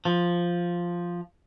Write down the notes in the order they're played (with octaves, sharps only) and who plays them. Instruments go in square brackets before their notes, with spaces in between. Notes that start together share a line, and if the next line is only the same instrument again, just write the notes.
[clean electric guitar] F3